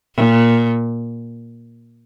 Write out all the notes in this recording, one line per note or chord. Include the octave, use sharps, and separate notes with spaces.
A#2